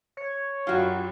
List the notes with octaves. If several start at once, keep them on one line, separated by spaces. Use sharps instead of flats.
C#5
F#2 F#3 G3 F4 F#4